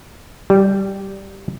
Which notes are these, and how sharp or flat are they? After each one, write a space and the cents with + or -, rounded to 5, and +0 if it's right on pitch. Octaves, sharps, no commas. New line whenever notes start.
G3 -5